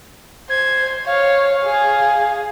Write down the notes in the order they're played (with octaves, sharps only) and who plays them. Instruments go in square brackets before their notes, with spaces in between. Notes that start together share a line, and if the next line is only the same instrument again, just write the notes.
[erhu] C5 [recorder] G#6
[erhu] C#5 [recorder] F5
[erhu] G#4